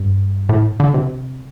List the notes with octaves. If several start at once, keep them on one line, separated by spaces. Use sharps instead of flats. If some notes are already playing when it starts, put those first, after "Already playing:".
Already playing: G2
A2
D3
C3